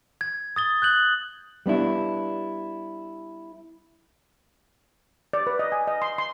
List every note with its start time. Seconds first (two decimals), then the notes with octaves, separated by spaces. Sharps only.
0.21 G#6
0.56 D#6 A6 G7
0.82 F#6 G6 F#7
1.66 G3 B3 D4 E4
5.33 D5
5.47 B4
5.59 D#5
5.72 G#5
5.87 D#5
6.02 C6
6.18 C6